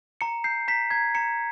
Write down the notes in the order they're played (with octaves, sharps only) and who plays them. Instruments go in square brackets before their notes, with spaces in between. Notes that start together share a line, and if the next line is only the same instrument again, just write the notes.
[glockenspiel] A#5 C#7
G6 C7
A#5 B6
A#5 G#6
A#5 C#7